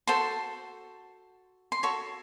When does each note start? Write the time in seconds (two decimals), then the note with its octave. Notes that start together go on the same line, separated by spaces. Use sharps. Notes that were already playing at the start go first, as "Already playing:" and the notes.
0.07 F#4 A4 C5 C6
1.72 C6
1.83 F#4 A4 C#5 C#6